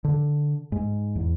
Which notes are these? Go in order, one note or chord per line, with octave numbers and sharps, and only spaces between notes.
D3
G#2
E2